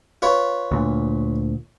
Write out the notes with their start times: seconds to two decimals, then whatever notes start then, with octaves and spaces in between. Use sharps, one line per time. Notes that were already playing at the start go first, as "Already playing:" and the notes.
0.22 F4 B4 C#5
0.71 D2 A#2